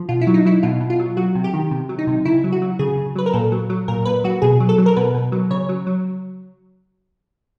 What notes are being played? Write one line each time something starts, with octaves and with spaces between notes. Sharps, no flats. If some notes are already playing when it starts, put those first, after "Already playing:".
Already playing: F3
B2 F4
E4
F#3
D#4
F#3 E4
B2 F4
B2
F4
F#3
F#3 F#4
C3
G4
D#3
C3
F#3
D#4
C3
C#3 E4
F#3
F#4
F#3
C#3 G#4
C#3
F#3 B4
A#4
A#2 A4
F#3
F#3
A#2 A#4
A#2 B4
F#3 F#4
B2 G#4
F#3
A4
F#3
A#4
B2 B4
B2
F#3
C#3 C#5
F#3
F#3